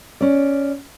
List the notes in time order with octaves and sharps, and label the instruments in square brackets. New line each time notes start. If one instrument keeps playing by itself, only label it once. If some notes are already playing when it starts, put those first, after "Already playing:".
[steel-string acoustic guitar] C#4 D5